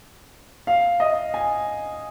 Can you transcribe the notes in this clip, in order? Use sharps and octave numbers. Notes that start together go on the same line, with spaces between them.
F5
D#5
G#5